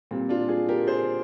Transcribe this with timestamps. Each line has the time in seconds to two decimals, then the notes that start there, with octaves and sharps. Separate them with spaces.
0.11 A#2 G3 C4
0.29 D4 F4
0.49 F4 G#4
0.69 G4 A#4
0.87 G#4 C5